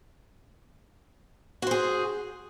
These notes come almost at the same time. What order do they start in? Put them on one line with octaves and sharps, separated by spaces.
F#4 C5 G#4